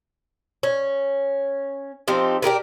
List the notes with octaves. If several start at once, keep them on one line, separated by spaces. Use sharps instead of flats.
C#4
F3 C4 D#4 G4
D4 G4 A#4 B4